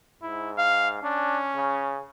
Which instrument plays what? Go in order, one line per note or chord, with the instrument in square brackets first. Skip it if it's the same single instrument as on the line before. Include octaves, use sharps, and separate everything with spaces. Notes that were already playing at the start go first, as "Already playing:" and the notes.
[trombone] G#2 [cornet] E4
[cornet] F5
[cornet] C#4 [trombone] D4
[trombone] C#3